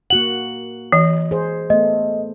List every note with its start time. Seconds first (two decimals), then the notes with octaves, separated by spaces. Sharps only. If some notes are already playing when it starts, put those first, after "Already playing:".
0.10 A#3 F#4 F#5 F#7
0.92 E3 D#5
1.31 G#4 C5
1.70 A3 B3 D#5